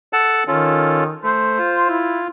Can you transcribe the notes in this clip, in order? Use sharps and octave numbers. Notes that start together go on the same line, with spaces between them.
A4 F#5 A5
D#3 C#4 F4 A4
A3 C5
F4
E4